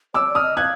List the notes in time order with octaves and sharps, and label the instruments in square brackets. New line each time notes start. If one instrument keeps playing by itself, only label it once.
[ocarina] C#5 [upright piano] D6 E6
[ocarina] D5
[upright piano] D#6 F6
[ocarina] D#5
[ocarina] F5 [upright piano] F#6 G#6